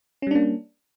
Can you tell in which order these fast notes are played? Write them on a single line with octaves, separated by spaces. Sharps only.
C#4 G3 D4 A#3